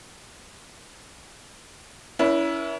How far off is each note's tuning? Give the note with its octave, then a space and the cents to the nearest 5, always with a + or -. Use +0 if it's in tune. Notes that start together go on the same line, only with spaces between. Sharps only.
C#4 +35 E4 +0 B4 -45